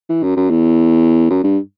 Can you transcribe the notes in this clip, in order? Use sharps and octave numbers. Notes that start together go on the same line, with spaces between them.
E3
F#2
F#2
E2
F#2
G2